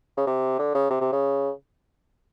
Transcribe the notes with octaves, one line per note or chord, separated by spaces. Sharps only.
C#3
C3
D3
C#3
C3
C3
C#3